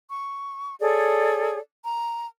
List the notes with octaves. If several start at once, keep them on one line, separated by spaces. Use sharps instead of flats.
C#6
G#4 A4 C#5 D5
A#5